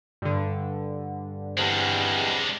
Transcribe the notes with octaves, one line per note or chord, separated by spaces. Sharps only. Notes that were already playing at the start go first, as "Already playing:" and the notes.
G2 D3
E2 G3 G#3 C4 D4